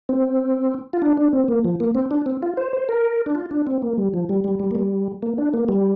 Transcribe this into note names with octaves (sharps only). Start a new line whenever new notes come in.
C4
F4
D4
D4
C4
A#3
F3
A#3
C4
D4
C4
F4
C5
C5
A#4
D4
F4
D4
C4
A#3
G3
F3
G3
G3
G3
A#3
G3
A#3
D4
A#3
G3